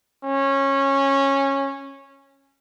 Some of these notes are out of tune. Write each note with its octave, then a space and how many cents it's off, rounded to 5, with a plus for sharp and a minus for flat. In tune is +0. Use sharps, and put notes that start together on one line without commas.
C#4 -15